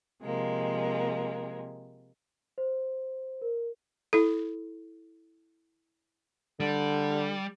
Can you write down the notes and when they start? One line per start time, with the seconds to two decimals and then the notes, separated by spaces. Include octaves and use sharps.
0.22 C3 F3 G#3 A#3
2.58 C5
3.42 A#4
4.13 E4 A4
6.60 D3 G3